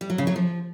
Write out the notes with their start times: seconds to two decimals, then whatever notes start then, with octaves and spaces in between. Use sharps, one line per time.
0.01 G3
0.10 F#3
0.18 C#3
0.27 F#3
0.36 F3